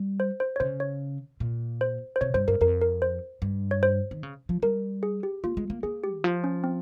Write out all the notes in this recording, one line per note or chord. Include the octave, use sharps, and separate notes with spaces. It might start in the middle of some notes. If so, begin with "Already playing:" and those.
Already playing: G3
C5
C5
C#5
C#3 C5
C#5
A#2
C5
C5
C3 C#5
G2 C5
G2 A#4
F2 A#4
A#4
C5
G2
C#5
C5
D#3
C#3
F3
G3 A#4
G#4
G4
A#3 F4
G#3
A#3
A#3 G#4
G4
D#3
F3 F4
C#4
C4